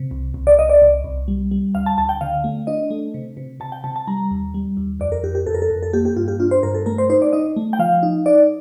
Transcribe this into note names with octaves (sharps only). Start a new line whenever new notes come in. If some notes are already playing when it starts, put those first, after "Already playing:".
Already playing: C3
C2
C2
D5
C2 D#5
D5
C2
C2
G3
G3
D2 F5
A5
D2 A5
G5
D3 F5
A3
D4 D#5
A3
C3
C3
C3 A5
G5
C3 A5
A5
G3 A#5
D#2
G3
D#2
F2 D5
A#4
F2 G4
G4
F2 A4
A#4
A4
F2
A4
A#3 G4
G4
G2 F4
G4
D4 F4
C5
G2 A#4
A4
A3 A#4
C5
D#4 C5
D5
D#4 D#5
A3
G5
F3 F5
D#4
D#4 D5